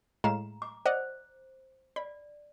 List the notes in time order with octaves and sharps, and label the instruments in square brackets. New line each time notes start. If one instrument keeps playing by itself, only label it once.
[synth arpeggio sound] A2 G#3 F5 [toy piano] A#5
[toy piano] D6
[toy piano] C5 [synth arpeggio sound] D5 D#5 F#5
[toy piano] D5 [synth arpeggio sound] B5